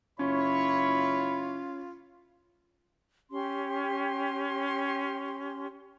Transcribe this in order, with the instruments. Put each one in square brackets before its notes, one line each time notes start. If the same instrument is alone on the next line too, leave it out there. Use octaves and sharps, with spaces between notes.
[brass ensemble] F#1 E4 C#5 [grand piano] C#4 [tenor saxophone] F4 [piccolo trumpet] B5
[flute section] C#4 G4 C6